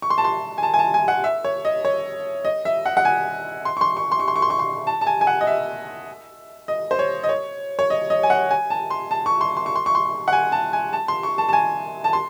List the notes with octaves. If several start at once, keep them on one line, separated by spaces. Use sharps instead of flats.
C#6
C6
A5
C6
G#5
A5
G#5
A5
G#5
F#5
E5
C#5
D#5
C#5
D#5
E5
F#5
F#5
G#5
C6
C#6
C6
C#6
C6
C#6
C6
C#6
C6
C#6
C6
A5
A5
G#5
G#5
F#5
D#5
E5
D#5
C5
C#5
D#5
C#5
C#5
D#5
D#5
G#5
F#5
G#5
A5
C6
A5
C#6
C6
C6
C#6
C6
C#6
C6
F#5
G#5
A5
G#5
A5
C6
C#6
A5
A5
G#5
A5
C6